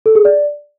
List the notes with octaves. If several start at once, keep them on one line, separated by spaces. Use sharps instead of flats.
A4
G#4
D5